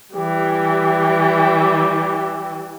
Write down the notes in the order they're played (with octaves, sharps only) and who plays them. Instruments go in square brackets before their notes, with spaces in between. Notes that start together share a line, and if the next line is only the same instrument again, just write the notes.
[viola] E3 G3 [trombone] G4